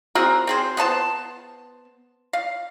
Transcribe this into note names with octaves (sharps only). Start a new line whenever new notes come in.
C4 F#4 G#4 A#4
C4 G#4 C5
B3 C5 A5 C6
F5